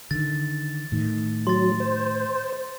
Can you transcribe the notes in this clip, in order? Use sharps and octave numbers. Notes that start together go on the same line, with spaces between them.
D3 D#3 A6
A2 D#3
F#3 C6 A6
C5